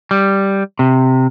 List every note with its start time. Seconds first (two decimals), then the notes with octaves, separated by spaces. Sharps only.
0.11 G3
0.79 C3